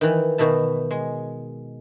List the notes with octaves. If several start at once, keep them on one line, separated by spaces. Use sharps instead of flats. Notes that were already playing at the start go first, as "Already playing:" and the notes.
D#3 E3
B2 D#3 E5 A5
G#3